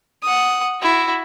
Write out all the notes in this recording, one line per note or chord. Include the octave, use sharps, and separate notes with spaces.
F#5 D#6
E4 F#4